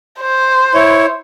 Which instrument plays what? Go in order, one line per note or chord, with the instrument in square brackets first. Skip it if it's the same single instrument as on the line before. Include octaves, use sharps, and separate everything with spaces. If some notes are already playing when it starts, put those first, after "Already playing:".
[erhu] C5
[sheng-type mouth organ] E4 C#5